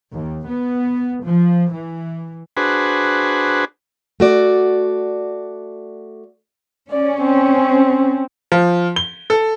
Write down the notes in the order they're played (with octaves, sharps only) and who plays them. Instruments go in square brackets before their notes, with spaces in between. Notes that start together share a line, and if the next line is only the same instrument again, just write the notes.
[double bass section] D#2
B3
F3
E3
[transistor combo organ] D4 F#4 G#4 B4 C5
[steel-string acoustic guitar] A3 F#4 D5
[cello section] C#4 [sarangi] D5
[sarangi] C4
[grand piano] F3
G7
A4